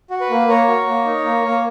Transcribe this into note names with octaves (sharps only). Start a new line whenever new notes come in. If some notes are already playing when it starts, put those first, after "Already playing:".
F#4
B4
A#3
A#3 A#4 C#5
F#4
A#3
D#4
A#3
A#3 A#4